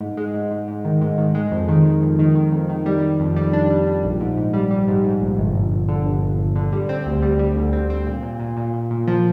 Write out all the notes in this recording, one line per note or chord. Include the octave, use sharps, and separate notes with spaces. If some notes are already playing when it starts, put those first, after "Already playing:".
G#2
G#3
G#2
G#2
G#2
D#3
G#2
D#3
G#3
F2
D#3
D#3
F2
D#3
D#3
F2
D#3
G3
G3
F2
G3
D4
G3
G3
A#1
G#2
G#2
G3
G3
G#2
G#2
A#1
G1
G1
G1
D3
G1
G1
G1
D3
G3
C4
D2
G3
G3
D2
C4
C4
A#2
A#2
A#2
A#2
A#2
A#2
F3